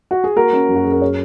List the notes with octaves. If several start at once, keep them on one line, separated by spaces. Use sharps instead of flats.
F#4
G#4
A#3 F#4 A#4
C#4
F#2
F#4
F#2 G#4
A#4
G#4 C#5